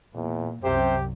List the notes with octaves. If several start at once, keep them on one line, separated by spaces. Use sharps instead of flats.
E2 A#2
C2 F#2 C3 G4 C5